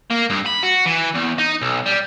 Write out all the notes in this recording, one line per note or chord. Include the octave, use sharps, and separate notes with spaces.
A#3
G2
B5
F#4
E3
E2
D#4
B1
G3